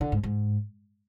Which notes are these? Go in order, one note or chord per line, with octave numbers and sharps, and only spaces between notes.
D3
G#2
G#2